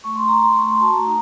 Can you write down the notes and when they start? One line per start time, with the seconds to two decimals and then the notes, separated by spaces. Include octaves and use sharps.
0.04 A3 C#6
0.16 C6
0.28 A3 A#5
0.40 C6
0.55 A3 C#6
0.68 C6
0.81 F#4 A5
0.93 A#5
1.06 D#4